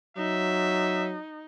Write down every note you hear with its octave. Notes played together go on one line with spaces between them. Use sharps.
F#3 D#4 E5